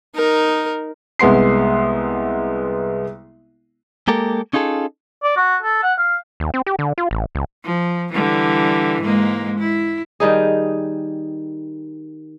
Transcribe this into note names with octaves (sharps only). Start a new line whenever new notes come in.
D#4 A#4
C2 G#3 B3 C6 C7
G#3 A#3 G4 A4 A#4
C#4 D#4 F4 G#4 A4
D5
F#4
A4
F#5
F5
D#2
C4
G4
D3
F4
A1
C#2
F3
D3 E3 G3
G#2 G#3 A#3
E4
D#3 G3 D#4 G#4